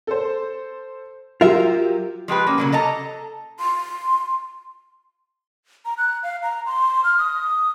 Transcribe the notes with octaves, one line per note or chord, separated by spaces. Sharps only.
A4 C5
F#3 F4 G4 A#4 E5
F3 G#3 G4 B4
A#3 C#4
C#3 F#3 A#3
A4 D#5 A5 A#5
C6
A#5
F#6
F5
A#5
C6
F6
D#6